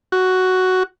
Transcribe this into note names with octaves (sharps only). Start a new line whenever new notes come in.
F#4